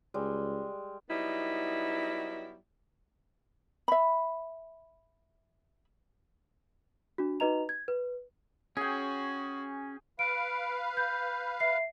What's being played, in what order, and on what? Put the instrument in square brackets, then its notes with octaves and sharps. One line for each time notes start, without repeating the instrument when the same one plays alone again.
[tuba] C#2 [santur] G3 G#3
[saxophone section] F#3 G3 B3 D#4 E4
[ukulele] E5 B5
[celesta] D4 F#4
D#4 F#4 B4 D#5 A#5 F7
G#6
B4
[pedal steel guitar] C#4 [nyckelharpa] F#4 [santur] G#4 G5
[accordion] B4 F5 [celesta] D7
[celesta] G6
E5 C7